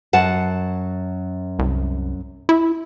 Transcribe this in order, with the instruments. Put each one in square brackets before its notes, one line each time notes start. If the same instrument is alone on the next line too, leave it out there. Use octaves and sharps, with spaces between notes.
[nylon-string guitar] F#2 F#5 A5
[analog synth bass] C2
E4